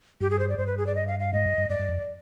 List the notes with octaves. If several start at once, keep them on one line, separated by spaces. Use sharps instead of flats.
G2 G4
G#4
C5
D5
G2 C5
B4
G#4
D5
D#5
F5
F5
G#2 D#5
G2
G2
G2 D5
G2
F2